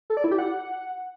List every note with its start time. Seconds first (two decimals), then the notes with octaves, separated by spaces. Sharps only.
0.10 A4
0.17 D5
0.24 E4
0.31 G4
0.38 F#5